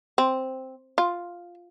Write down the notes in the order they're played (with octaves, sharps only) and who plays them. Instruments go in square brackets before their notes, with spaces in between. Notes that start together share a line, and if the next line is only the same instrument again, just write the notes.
[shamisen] C4
F4